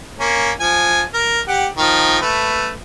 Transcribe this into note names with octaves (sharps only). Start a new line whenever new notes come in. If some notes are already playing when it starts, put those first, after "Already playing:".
A#3 C#4
F3 G#5
A#4
G4 F#5
D#3 F3 A#4
A3 B4